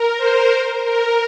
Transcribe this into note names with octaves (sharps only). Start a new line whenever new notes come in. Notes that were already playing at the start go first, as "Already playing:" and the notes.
Already playing: A#4
C5
A#4